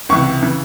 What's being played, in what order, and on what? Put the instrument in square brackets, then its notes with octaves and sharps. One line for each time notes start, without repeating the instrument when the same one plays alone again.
[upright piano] C#2 C3 E3 C#6
C#3 E3